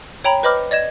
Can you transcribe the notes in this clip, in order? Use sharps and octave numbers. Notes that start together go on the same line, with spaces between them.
C#5 G5 A#5 B5
B4 C5 D#5 B5 D6 F6
D5 D#5 G#6 E7